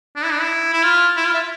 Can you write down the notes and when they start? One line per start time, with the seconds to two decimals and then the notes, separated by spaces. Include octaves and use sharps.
0.16 D4
0.24 E4
0.32 D4
0.40 E4
0.73 E4
0.83 F4
1.16 E4
1.25 F4
1.34 E5